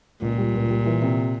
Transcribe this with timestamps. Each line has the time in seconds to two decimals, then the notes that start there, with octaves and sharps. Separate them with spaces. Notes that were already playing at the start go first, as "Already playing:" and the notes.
0.22 C#2 A#2
0.37 G3
0.54 C#2
0.70 G3
0.86 E3
1.02 C3